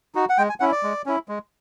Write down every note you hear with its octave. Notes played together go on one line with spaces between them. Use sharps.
D#4 F#4
F#5
G#3 G5
G#5
C#4 E4 F#5
D5
G#3
C#4 E4
G#3